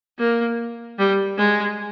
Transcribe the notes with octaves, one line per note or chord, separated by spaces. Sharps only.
A#3
G3
G#3